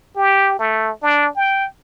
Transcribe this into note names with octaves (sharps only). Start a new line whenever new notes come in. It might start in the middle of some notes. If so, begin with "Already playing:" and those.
G4
A3
D4
G5